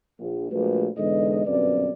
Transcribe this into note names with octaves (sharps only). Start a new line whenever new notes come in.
A#1
A#1 F3 G#3 A3 F#4 B4
E2 G#2 D3 G#3 D#5
G1 F#2 B2 C4 B4 D5